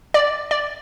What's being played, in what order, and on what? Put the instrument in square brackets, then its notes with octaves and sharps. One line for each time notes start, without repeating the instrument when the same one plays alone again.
[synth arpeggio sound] D5
D5